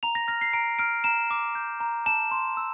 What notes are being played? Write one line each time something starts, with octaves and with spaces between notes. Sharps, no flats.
A#5 F7
A#6
F6 A#6
C7
A#5 D7
F6 D7
A#5 E7
D6
G6
A#5
A5 E7
C6
E6